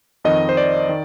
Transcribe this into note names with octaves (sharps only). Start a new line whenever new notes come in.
F2 D#3 D#5
C5
D5
D#3